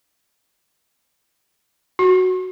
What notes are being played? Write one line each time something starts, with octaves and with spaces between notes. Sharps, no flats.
F#4